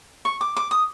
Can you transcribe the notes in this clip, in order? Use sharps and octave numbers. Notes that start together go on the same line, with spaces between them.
C#6
D6
D6
D#6